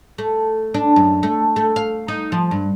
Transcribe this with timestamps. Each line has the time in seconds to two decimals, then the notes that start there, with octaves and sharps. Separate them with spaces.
0.18 A3
0.74 D4
0.96 F#2
1.23 A3
1.56 A3
1.76 F5
2.08 D#4
2.32 F3
2.51 G2